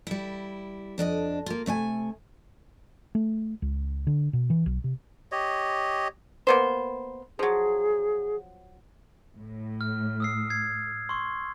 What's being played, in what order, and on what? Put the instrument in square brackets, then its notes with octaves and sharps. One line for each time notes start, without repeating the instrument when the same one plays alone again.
[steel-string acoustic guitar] G3 E4
F2 D4 A4 D#5
A#3 F4
C3 A3 C#5 G#5
[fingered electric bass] A3
C#2
D3
B2
E3
B1
C3
[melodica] G4 C#5 D#5
[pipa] A#3 B3 C5
[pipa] F3 F#3 [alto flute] G#4
[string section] A2
[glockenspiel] F6
D#6 E6 C7
G#6 C7
C6 C#6